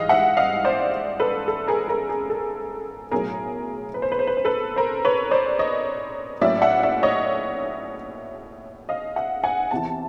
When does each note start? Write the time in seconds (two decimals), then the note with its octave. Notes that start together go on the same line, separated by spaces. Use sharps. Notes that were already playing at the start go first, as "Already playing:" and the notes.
Already playing: G#2 E3 G3 D#5 F5
0.09 E5 F#5
0.37 D#5 F5
0.64 C5 D5
1.20 A4 B4
1.48 A4
1.68 G#4 A#4
1.88 G#4 A#4
2.09 G#4
2.30 A4
3.11 B1 A2 F#3 G#4 A#4
3.94 B4
4.02 C5
4.12 B4
4.19 C5
4.27 B4
4.37 C5
4.45 A4 B4
4.76 A#4 C5
5.05 B4 C#5
5.31 C5 D5
5.59 C#5 D#5
6.41 A2 F#3 A#3 C#4 E4 D5 E5
6.62 E5 F#5
6.83 D5 E5
7.03 C#5 D#5
8.89 D#5 F5
9.16 E5 F#5
9.44 F#5 G#5
9.71 E2 C3 E3 A5